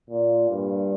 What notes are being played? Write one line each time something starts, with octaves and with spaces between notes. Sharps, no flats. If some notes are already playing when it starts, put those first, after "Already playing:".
A#2
G2